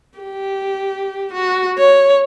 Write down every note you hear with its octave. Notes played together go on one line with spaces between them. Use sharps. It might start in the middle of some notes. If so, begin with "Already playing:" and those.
G4
F#4
C#5